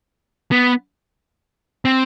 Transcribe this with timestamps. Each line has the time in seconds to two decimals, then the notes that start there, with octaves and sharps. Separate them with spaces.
0.52 B3
1.85 C4